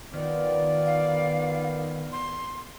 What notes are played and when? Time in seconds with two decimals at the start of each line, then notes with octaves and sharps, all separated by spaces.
0.13 D#3 B3 F4 D5
0.86 F5
2.12 C6